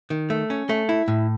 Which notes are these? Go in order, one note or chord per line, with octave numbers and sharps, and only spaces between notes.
D#3
A3
C#4
A3
E4
A2